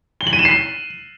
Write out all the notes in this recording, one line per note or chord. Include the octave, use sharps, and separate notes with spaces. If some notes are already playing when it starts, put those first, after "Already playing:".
G7
F#7
D#7
E7
C7